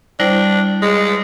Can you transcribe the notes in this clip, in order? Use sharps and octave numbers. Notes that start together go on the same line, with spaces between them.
G3 D4 E4 C5
G#3